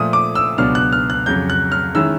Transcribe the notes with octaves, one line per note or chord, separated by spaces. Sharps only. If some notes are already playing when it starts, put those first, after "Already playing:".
Already playing: A#2 F3 A3 D#6
D6
E6
C#2 B2 F#3 B3 D4 F6
F#6
F6
F#6
F2 C#3 F#3 G6
F#6
F6
D#3 G#3 C#4 E4 E6